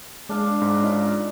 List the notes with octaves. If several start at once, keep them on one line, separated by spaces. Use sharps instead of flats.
G#3 D4 F5
G#2
C#4 D#4 F4 F5